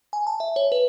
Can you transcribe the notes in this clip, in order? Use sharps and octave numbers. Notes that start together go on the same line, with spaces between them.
G#5
A5
E5
C#5
B4